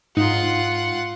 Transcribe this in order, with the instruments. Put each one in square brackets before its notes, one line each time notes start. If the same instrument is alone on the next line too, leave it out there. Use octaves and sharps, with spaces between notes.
[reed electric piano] G#2 [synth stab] D#4 [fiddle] F4 F#5